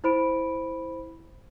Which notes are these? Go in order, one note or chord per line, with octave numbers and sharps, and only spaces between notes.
E4 C5 B5 D7